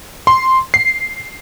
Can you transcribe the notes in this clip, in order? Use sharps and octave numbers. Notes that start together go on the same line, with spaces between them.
C6
C7